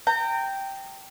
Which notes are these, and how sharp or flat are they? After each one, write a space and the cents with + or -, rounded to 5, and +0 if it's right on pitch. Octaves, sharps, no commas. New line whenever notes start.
G5 -5 A#5 -30